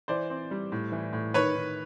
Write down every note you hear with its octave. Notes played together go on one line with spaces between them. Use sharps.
E3 C5 D5
C4
G3
A2
E3
A2
D#3 B4 C#5
D#3